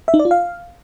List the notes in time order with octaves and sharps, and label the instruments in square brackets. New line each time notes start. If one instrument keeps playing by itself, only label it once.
[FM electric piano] E5
D#4
D5
F4
F5